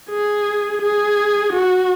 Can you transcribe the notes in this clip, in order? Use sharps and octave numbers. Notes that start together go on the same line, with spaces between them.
G#4
G#4
F#4